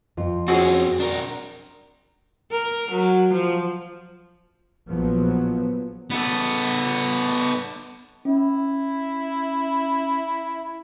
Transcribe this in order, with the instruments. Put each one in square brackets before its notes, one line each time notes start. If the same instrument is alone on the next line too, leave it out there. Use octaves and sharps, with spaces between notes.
[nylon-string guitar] F2 F4
[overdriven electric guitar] C4 C#4 [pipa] F#4 G#4
[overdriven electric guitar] D4 A#4
[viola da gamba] A#4
F#3
F3
[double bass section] A#1 A#2 F3 F#3 B3
[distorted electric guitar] B3 A4
[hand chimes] C#4 [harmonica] E4